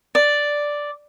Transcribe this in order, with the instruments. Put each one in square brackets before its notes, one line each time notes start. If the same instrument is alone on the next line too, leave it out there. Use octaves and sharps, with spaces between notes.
[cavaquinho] D5